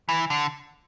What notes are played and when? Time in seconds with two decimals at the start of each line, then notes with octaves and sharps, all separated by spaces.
0.09 E3
0.30 D3